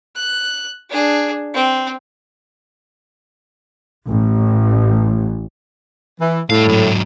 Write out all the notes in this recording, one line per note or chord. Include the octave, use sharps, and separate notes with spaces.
F#6
D4 G#4
C4
A1
E3
A2 G3 F5
G#2 F#3